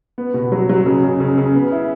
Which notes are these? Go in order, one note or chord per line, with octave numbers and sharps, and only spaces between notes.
B3
B2
F#3
F#3
C#3
C#3
C#3
C#3
B3
E4